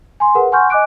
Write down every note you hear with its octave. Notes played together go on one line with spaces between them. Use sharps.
G#5 C6
G#4 A#4 B4 F#5
F#5 G#5 C6 C#6 F6 G6
D#5 G#5 D6 F#6 D7